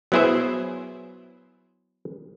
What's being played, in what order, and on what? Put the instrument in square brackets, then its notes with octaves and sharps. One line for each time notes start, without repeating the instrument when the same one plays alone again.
[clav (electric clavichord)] F#3 B3 E4 G#4 C5 E5